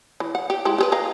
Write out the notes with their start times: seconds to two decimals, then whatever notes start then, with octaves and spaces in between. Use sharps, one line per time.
0.20 E3
0.35 F#5
0.50 G4
0.65 G#3 E4 G4
0.78 G4 G#4 B4
0.92 D#5 F5 A#5